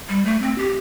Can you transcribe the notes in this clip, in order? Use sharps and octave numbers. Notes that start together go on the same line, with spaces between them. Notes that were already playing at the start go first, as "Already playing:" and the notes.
G3
A3
C4
G4